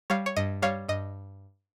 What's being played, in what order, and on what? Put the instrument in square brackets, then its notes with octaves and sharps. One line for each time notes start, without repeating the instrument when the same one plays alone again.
[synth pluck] G3 C#5 F5
C#5
G2 D#5
G3 C#5 F5
G2 D#5